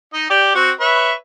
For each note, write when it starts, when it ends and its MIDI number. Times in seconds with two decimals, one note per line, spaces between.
0.14 0.27 63
0.14 0.27 75
0.30 0.53 67
0.30 0.53 74
0.55 0.71 60
0.55 0.71 66
0.80 1.13 71
0.80 1.13 73
0.80 1.13 76